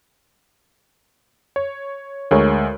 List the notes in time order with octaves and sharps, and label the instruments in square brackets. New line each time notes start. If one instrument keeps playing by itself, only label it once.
[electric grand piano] C#5
[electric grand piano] D2 G#3 [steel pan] G#4 A#4 C#5